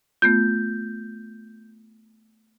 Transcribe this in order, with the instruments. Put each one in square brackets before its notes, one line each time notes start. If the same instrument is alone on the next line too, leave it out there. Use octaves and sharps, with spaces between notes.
[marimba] A3 B3 F4 [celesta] G6